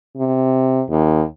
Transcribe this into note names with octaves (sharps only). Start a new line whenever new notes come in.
C3
D#2